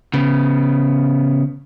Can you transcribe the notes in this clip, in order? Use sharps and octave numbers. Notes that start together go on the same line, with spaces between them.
C#3 B3